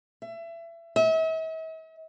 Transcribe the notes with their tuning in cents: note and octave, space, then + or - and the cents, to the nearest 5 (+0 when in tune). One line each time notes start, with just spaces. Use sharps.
E5 +25
E5 -45